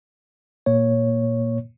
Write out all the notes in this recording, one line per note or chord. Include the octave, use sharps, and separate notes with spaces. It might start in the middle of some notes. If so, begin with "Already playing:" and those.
A#2 A#3 C#5